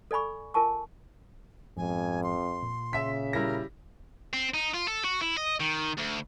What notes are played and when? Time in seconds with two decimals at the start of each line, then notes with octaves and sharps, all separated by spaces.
0.11 A4 D5 G#5 B5 C#6
0.54 F4 A#4 G#5 A5 C#6
1.77 F2 G#2 F3 G#5
2.24 C6
2.62 A#2
2.93 C#3 E5 B6
3.33 G3 E4 A#4 A#6
4.34 C4
4.54 D#4
4.74 F4
4.88 A4
5.04 F#4
5.22 E4
5.37 D#5
5.60 D#3
5.98 D2